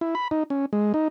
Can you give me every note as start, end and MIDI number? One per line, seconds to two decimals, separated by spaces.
0.01 0.15 64
0.15 0.28 83
0.31 0.43 63
0.50 0.66 61
0.73 0.93 56
0.94 1.08 63